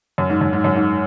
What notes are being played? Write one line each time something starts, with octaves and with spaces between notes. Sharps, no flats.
F#2
G#2
F#2
G#2
F#2
G#2